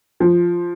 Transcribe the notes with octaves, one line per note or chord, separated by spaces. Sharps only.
F3